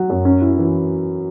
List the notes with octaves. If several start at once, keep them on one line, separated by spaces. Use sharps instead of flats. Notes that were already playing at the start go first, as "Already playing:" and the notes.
Already playing: F#3 F#4
F#2
C#4
E4
E3